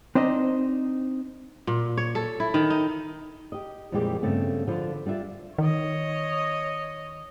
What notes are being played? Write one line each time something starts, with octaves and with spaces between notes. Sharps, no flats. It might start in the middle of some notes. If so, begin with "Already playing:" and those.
C4 D4 D#4 C5 D#5
A#2
C#5
A4
E4
D#3
D#4
G4 D#5
F2 A#2 E3 G3 G#3 G4
G2 C#3 A3 B3 C4
D3 F3 F4 B4 C5
G3 D4 F4 E5
D#3 C#5 D#5